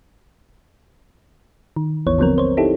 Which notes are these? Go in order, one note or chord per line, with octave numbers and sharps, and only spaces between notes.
D#3
G#1 D#2 E3 B3 C#5
D3 F3 F#3 B3 C4 A#4
C5 C#5
D#4 E4 G4 A4